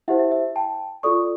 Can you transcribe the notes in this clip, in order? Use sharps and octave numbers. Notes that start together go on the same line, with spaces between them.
E4 G4 C5 E5 F#5
E5
E5
G5 A5
F4 A4 D5 C#6 D#6